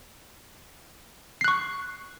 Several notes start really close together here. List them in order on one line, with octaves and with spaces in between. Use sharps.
C7 F#6 C#6